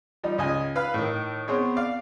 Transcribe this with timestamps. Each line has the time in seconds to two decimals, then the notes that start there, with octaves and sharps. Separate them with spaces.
0.24 F3 G3 D#4
0.38 C#2 D#5 G#5
0.76 B4 F5 B5
0.94 A2 D#3
1.48 B3 C4 G#4 C#5
1.76 D5 F5